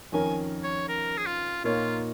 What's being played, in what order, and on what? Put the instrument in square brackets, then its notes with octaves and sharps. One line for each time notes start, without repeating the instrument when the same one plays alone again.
[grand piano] F2 D#3 C#4 A#4 [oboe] G#5
[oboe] C#5
A#4
G#4
F4
[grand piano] A#2 A#3 D#4 A#4 C#5 [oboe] F4